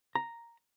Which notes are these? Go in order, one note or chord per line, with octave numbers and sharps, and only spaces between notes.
A#5